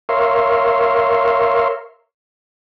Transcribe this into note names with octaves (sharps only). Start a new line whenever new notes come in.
A#4 C#5 E5 F5 C6